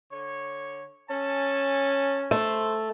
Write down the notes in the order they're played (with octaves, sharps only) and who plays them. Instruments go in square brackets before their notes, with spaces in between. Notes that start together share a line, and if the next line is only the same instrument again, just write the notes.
[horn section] D3 C#5
[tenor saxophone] C#4 [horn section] A4 G#5 A5
[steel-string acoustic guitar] A3 [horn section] C5